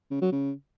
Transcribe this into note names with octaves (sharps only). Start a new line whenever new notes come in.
C#3
F#3
C#3